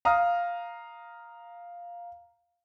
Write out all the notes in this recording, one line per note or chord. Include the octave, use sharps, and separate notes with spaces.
F5 A#5 D#6 F6